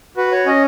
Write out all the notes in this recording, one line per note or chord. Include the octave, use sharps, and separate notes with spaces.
F#4 B4
C#5
C#4 D#5